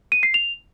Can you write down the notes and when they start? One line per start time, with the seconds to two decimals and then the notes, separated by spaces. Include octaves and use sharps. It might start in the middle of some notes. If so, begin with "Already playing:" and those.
0.12 D#7
0.23 C7
0.34 F7